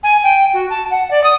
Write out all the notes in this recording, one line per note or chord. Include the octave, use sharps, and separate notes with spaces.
G#5
G5
F#4
A5
F#5
D5
D#6